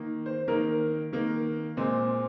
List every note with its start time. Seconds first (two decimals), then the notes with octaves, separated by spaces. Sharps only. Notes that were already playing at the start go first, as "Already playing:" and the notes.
Already playing: D#3 A#3
0.26 C5
0.48 D#3 A#3 A#4
1.13 D#3 A#3
1.77 A#2 G#3 C4